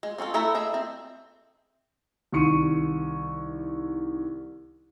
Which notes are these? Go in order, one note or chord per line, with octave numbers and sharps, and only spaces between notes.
G#3
C4 C#4 F4 A4
A3 E4 A4 E5 A#5
G#4 D#5 E5
C4
C2 D#3 C#6 C#7 D#7